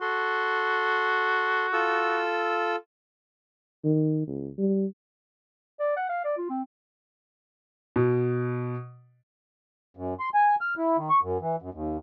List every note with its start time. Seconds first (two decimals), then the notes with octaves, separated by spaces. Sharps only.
0.01 F#4 A4 C6
1.73 F4 A4 E6
3.84 D#3
4.27 C#2
4.58 G3
5.80 D5
5.97 F#5
6.09 F5
6.25 D5
6.38 F4
6.50 C4
7.96 B2
9.97 F#2
10.20 C6
10.34 G#5
10.61 F6
10.78 E4
10.97 D#3
11.10 C#6
11.23 F#2
11.41 E3
11.62 F#2
11.74 D#2